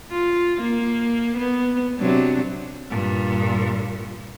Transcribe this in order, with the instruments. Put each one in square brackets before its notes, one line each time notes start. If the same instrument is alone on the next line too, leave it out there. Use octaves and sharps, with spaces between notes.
[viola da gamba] F4
A#3
B3
C3 F#3 D4
[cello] G2 A#2